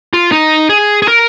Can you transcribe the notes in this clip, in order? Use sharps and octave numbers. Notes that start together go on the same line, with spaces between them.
F4
D#4
G#4
G#4
A#4